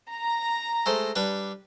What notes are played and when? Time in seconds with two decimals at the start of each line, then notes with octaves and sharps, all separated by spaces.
0.11 A#5
0.86 G#3 A3 C5
1.16 G3 D4 B4